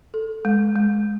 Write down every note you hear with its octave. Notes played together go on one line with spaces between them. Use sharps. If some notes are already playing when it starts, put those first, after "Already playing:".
A4
G#3
G#3